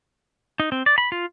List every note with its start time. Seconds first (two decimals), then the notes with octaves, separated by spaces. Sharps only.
0.60 D#4
0.72 C4
0.86 D5
0.98 B5
1.12 F4